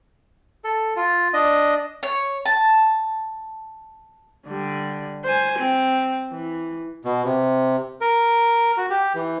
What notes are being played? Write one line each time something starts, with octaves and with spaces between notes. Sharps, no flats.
A4
F4
D4 D#5
C#5
A5
D3 G3
C5 G#5
C4
E3
B2
C3
A#4
F#4
G4
E3